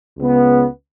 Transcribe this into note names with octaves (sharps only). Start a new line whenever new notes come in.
C#2 C#3 B3